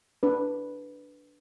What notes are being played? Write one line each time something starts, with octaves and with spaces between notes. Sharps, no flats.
D4 B4